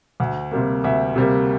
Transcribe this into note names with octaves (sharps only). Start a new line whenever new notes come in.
D2
C3 G3 A#3
D2 E5
C3 G3 A#3